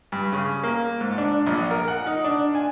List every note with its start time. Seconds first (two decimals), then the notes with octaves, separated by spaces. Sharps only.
0.12 G2
0.32 C#3
0.64 A#3
1.01 G#2
1.18 D4
1.47 A#1
1.71 A#4
1.88 F#5
2.06 D#4
2.24 D4
2.55 G#5